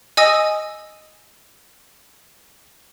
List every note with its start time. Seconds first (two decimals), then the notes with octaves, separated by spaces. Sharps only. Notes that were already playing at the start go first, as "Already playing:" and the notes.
0.17 D#5 G#5 D#6 E6 A#6